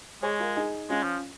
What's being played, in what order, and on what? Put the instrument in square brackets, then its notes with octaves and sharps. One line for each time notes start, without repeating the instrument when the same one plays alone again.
[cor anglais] G#3 [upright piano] G#4 C#5
[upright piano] F4 A#4
D#4 G#4
[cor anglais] G#3 [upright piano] C#4 F4
[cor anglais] F3